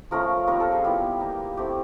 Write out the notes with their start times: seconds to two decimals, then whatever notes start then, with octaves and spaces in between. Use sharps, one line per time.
0.11 F3 A3 C#4 F4 A#4
0.48 G3 C4 D#4 A#4
0.60 A4
0.72 G#4
0.84 G3 B3 E4 G4
1.21 A#3 D#4
1.57 A3 C4 E4 G4